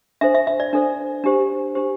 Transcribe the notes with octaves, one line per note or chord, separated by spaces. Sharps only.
D4 A4 C5 E5
E5
E5
D5
D4 A4 C5
D4 G4 C5
D4 G4 C5